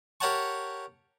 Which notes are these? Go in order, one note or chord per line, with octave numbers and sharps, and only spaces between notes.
G4 A#4 C#5 F#5 A5 C#6